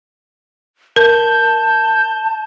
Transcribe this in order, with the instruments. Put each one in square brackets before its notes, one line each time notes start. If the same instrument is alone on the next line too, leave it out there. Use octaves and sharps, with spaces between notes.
[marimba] A#4 [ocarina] A5 [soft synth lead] G6